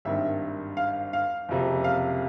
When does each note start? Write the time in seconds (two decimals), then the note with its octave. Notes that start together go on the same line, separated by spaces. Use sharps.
0.05 G#1 G2 D#3 E5
0.77 F5
1.13 F5
1.48 F#1 F2 C3
1.84 F5